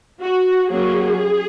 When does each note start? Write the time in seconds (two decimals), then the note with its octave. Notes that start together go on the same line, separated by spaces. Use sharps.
0.20 F#4
0.70 F#3 A#3 C#4 G#4